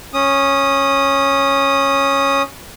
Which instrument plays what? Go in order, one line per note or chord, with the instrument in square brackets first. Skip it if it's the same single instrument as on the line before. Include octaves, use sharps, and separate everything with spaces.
[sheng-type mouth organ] C#4 D#6